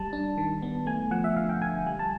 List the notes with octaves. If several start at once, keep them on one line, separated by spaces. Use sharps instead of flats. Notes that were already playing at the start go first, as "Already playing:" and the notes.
Already playing: G3 A5
D4
D#3
B3
A3 G#5
F3 F#5
E5
D3 F5
G5
D3 G#5
G3 G#5
A5